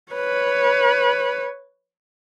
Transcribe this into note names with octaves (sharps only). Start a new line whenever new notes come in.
B4 C#5